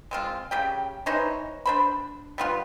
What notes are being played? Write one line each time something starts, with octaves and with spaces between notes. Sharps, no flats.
G#3 C4 F4
C#3 G4 G5
E3 D#4 C5 C#5
D4 C5 B5
G3 B3 F4